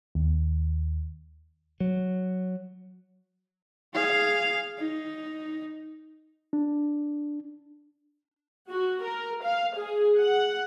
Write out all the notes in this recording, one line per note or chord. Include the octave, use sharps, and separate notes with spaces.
D#2
F#3
G#4 F5
D#4
D4
F#4
A#4
F5
G#4
F#5